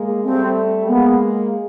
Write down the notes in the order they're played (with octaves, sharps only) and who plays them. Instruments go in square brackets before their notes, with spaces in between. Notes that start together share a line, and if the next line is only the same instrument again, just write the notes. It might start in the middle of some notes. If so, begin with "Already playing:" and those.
Already playing: [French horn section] G#3 A#3
[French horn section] G3 A3 [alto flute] C4
[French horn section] G#3 A#3 [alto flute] B3